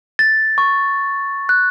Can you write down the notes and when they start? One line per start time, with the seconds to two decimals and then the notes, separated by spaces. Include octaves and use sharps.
0.19 A6
0.58 C#6
1.49 F#6